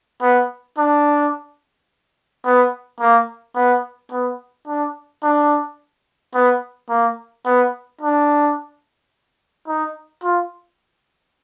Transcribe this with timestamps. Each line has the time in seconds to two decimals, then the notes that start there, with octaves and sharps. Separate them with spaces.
0.22 B3
0.78 D4
2.45 B3
3.00 A#3
3.56 B3
4.11 B3
4.67 D4
5.23 D4
6.34 B3
6.89 A#3
7.45 B3
8.01 D4
9.68 D#4
10.23 F4